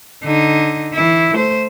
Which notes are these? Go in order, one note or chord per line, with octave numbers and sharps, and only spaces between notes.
D3 D#4
E3 E4
A3 C5